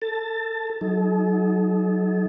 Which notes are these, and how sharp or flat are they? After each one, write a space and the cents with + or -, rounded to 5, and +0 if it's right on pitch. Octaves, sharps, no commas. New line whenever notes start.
A4 +15 A5 +15
F#3 +0 D#4 +15 A4 -40